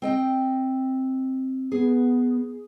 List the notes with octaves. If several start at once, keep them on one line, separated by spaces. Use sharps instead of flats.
C4 D#5 G5
B3 G#4